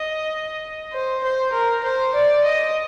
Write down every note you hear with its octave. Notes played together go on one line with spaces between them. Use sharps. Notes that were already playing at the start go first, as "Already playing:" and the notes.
Already playing: D#5
C5
C5
A#4
C5
D5
D#5